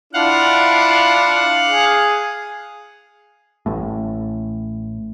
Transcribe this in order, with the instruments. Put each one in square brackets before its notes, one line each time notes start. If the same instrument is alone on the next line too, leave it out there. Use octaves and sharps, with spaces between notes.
[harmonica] D4 E4 F4 [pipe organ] F5 F#5
[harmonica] G#4
[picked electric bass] A1 A2